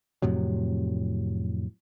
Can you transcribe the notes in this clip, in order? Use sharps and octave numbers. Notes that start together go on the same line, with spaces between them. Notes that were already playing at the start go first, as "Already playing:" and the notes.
F2 A2 C3 F#3